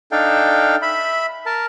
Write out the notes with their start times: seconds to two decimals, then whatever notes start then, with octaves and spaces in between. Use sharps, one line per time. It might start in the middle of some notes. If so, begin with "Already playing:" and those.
0.12 D4 D#4 A4 F5 G5
0.82 E5 B5
1.46 A#4 A5